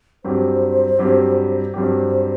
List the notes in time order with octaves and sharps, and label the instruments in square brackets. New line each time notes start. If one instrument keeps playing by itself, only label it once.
[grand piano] G2 F#3 C4 G4 [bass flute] C5
[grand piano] G2 F#3 C4 G4
[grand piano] G2 F#3 C4 G4 [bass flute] C5